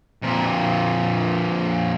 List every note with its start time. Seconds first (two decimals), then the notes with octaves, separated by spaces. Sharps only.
0.23 F2 A#2